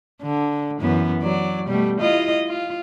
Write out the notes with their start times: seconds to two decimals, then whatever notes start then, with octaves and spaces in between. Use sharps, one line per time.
0.23 D3
0.80 F#2 E3 B3
1.23 F#3 D5
1.67 B2 G3 A3
2.00 E4 F4 D#5
2.48 F4